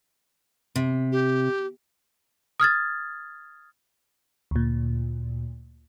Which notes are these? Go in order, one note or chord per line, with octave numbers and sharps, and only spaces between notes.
C3
G4
D#6 F6 G#6 A6
D2 A#2